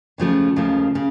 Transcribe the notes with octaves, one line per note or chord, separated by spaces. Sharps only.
D#2 C#3 F3 A3
D#2 C#3 F3 A3
C#3